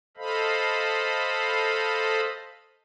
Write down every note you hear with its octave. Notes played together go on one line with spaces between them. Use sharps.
A4 C5 D#5 F5 B5